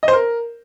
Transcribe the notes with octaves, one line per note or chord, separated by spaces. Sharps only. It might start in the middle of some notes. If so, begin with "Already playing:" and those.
D#5
C5
A#4